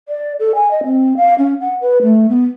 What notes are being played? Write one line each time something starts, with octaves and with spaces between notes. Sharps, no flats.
D5
A4
G#5
D#5
C4
F5
C#4
F#5
B4
A3
B3